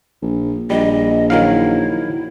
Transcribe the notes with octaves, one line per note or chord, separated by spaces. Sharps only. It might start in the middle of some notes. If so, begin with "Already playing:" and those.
A#1
A#1 G3 D#5
D#3 F#3 E4 F5